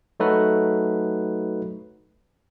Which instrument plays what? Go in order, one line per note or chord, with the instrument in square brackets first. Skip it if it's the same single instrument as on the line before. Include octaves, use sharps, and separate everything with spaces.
[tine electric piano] F#3 A3 D#4 F#4 A4 B4